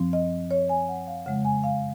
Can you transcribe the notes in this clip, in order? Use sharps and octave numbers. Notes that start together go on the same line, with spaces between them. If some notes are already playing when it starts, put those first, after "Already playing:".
Already playing: F#2 F3 C4
D#5
C#5
G#5
F#5
F5
F2 C#3 G#3 F#5
G#5
F5